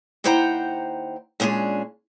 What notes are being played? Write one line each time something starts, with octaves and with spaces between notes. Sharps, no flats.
D#2 E4 C5 F#5 G5 A#5
A#2 G#3 C#4 D4 G#4